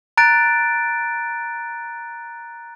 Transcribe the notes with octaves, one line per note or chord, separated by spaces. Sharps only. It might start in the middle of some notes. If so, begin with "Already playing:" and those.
A#5 F#6 A6 D7